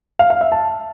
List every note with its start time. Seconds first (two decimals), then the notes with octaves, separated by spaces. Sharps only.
0.19 F5
0.30 F5
0.41 E5
0.52 A5